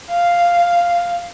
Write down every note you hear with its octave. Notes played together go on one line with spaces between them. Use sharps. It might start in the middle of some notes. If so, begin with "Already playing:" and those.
F5